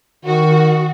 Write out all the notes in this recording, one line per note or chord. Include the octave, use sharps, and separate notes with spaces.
D#3 F#4